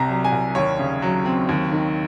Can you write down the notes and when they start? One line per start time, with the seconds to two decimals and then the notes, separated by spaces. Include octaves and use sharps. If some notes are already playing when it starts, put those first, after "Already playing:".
Already playing: C2 C3 A#5
0.09 F#3
0.25 G#5
0.32 C2
0.55 D#2 C#5
0.79 C#3
1.02 F#3
1.25 C4
1.49 D#2
1.72 D#3